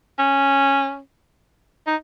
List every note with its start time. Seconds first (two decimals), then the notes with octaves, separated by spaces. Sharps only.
0.19 C#4
1.87 D#4